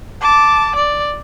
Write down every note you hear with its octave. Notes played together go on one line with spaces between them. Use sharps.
A5 D6
D5